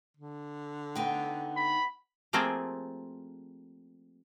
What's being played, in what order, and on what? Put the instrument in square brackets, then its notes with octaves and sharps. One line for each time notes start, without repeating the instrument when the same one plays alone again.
[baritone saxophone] D3
[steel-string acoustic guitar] B3 D#4 G5
[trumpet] B5
[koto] F3 A3 A#3 C4 G4 G#4